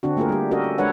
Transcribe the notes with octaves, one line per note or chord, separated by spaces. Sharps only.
D3 C4 D4 F#4
A3 A#3 F4 G#4 A#4
G3 G4
C#4 F#4 G4 A4 A#4 D#5
A4
G#3 D4 A4 B4 C#5 F#5